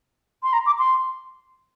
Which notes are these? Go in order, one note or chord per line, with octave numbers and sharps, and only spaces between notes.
C6
A#5
D6
C6